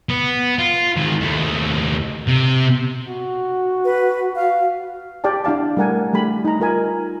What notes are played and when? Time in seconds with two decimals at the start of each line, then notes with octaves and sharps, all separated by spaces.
0.10 B3
0.59 F4
0.97 G#2 D#3
1.21 D#2 A3
2.28 C3
3.09 F#4
3.85 B4
4.35 F5
5.24 G4 D5 G5 A5
5.44 D4 E4 F5 A5
5.77 G3 A3 A#4 F#5 G#5
6.13 G3 A3 G4 B5
6.45 D#4 A#5
6.60 F4 A#4 G#5